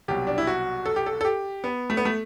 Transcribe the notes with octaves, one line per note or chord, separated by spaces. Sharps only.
C2 B2 F#3 G4
D4
E4
F#4
A4
G4
A4
A4
G4
B3
A3
B3
A3